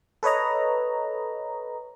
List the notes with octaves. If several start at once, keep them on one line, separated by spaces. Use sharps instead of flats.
A4 B4 C#5 D#5 A#5